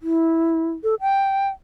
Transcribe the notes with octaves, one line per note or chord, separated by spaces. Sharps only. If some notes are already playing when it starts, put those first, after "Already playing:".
E4
A4
G5